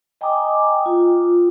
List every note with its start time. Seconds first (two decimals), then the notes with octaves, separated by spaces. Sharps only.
0.21 D#5 G5 G#5 A#5 D6 D#6
0.86 F4